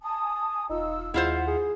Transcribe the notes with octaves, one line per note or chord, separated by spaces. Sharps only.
G#5 A5 D#6
E1 D#4 F4 E6
D#2 G#3 E4 F4 C5 F#5
G#4